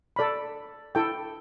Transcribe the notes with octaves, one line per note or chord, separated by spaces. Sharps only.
A4 D5 B5
E4 A4 G5